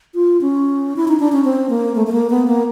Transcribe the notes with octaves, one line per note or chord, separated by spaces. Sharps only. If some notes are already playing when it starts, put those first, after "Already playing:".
F4
C#4
E4
D#4
D4
C#4
C4
A#3
A3
A3
A#3
B3
A#3